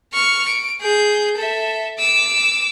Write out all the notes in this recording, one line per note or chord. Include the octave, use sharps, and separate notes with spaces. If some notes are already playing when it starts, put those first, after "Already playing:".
C#6 F6
D7
G#4 G6
A4 E5
D6 E6